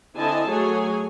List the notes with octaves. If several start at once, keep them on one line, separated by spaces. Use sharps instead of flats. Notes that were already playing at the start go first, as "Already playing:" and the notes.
D3 C4 E4 D#5 G#5 A5
F#3 A3 G#4 C#5 G#5